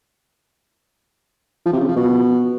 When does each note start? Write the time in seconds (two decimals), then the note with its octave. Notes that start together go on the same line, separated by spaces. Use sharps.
1.65 F3
1.73 C3
1.81 C#3
1.88 F3
1.96 B2